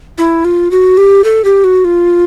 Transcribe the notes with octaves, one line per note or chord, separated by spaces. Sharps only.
E4
F4
F#4
G4
A4
G4
F#4
F4